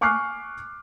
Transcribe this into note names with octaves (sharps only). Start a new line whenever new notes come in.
G#5 C#6 D6 F6 F#6 C7